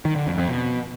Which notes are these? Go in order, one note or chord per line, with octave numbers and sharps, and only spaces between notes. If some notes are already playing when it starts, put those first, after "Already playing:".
D#3
D3
F2
F2
B2